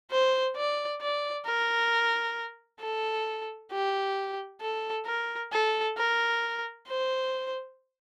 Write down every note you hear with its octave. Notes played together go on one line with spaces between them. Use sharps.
C5
D5
D5
A#4
A4
G4
A4
A#4
A4
A#4
C5